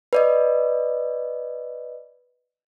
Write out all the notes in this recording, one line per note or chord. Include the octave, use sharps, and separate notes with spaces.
B4 D5 D#5